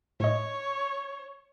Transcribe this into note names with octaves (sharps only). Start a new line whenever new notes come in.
A2 C#5 D#5